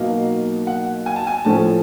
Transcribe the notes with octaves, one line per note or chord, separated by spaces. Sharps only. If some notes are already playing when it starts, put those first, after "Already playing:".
Already playing: B2 F#3 A#3 D#4 F5
F#5
G#5
A5
G#5
A2 F3 A3 C#4 A5